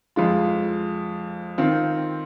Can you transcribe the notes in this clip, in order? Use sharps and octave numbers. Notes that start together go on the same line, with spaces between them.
F2 F3 G#3 F4
D#3 C4 F4